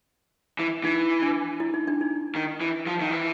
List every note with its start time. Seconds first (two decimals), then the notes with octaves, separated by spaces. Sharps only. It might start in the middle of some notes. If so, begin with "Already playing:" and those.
0.59 E3
0.84 E3 D#4
1.22 D4
1.60 E4
1.74 D#4
1.87 D4
2.01 D#4
2.35 D#3
2.61 E3
2.86 F3
3.01 D#3
3.10 E3